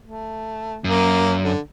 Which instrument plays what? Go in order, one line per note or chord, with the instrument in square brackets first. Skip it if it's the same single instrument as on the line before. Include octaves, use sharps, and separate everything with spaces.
[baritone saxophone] A3
[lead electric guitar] F#2 [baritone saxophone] A#3
[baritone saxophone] D3